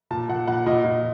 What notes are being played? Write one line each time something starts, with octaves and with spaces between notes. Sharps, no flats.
A#2 A5
A#2 F#5
A#2 F#5
A#2 D#5
A#2